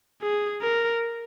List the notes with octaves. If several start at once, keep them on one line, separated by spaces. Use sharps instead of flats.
G#4
A#4